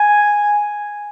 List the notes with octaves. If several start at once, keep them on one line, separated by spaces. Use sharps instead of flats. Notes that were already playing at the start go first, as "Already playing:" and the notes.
Already playing: G#5